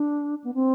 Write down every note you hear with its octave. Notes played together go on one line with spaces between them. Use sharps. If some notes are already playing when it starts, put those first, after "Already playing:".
Already playing: D4
B3
C4